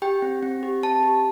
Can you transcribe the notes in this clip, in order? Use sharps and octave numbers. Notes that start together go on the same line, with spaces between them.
G4 G5
C4
C4
G4
C4 A5
G4